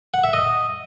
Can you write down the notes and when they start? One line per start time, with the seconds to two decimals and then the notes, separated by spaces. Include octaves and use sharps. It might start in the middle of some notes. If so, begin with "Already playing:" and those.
0.14 F#5
0.24 E5
0.33 D#5